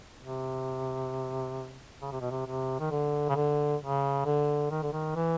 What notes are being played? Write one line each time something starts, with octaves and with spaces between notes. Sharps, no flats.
C3
C#3
C3
B2
C3
C3
D#3
D3
C#3
D3
C#3
D3
D#3
D3
D#3
E3